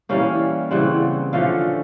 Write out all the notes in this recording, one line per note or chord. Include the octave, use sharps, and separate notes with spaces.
E3 G3 A#3 C#4 F5
C#3 E3 G3 C4 F#5
D3 F3 A3 C#4 F5